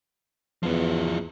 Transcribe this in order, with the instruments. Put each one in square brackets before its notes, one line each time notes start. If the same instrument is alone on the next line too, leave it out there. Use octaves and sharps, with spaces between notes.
[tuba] E2 [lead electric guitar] F3 B3